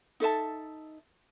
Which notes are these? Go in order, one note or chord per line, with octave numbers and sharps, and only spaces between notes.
D#4 A4 E5 A5